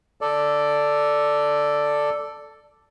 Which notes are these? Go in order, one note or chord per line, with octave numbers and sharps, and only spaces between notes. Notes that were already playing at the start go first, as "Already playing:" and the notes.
A4 D5